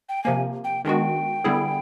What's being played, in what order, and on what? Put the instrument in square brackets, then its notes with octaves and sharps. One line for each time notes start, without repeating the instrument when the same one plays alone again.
[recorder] G5
[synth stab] C3 F3 A#3 [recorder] G#5
[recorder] G5
[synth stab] D#3 G#3 B3 D4 F#4 [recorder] G5
[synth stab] D3 G3 B3 E4 G#4